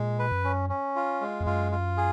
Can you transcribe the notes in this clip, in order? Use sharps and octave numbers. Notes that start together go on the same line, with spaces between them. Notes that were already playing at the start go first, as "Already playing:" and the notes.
Already playing: A#2 G#3
B4
F#2
C#4
C#4
F4
G#3
F2
F#2 F4
F4
G#4